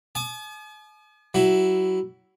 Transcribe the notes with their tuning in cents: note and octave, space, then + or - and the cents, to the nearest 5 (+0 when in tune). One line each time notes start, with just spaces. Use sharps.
G#5 +45 D#6 -40
F#3 +20 E4 +0